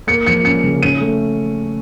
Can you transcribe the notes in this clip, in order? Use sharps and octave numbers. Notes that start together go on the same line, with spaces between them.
A#3 C#7
F3 C#7
C#4 C#7
C#3
C#4 D#7
A3